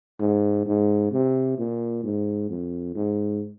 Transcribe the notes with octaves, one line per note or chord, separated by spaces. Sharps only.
G#2
G#2
C3
A#2
G#2
F2
G#2